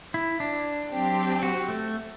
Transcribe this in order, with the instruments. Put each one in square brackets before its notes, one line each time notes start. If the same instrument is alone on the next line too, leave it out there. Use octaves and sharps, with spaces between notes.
[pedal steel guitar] E4
D4
[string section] F#3 C4 G4
[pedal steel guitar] F#4
A3